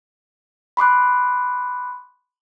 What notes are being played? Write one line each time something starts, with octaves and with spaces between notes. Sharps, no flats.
B5 C6 D6 F#6